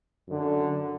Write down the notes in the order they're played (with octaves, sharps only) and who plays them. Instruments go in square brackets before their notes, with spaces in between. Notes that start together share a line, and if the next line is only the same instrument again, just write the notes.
[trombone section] F#2 D3